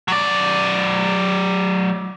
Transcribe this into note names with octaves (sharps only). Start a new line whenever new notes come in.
F#3 D5